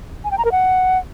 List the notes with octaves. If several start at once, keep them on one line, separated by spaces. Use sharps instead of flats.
G#5
G5
A#5
A#4
F#5